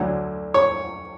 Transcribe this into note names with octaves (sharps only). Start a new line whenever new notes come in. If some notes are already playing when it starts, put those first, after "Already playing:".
Already playing: D2 D3 F#3
C#5